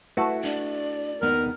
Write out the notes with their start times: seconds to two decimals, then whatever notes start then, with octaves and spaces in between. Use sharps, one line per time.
0.17 A3 E4 F#4 B4 A5
0.44 D4 D5
1.21 D#2 B3 D#4 A#4